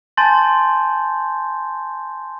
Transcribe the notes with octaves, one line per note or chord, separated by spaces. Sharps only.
G#5 A5 C6 G6 A6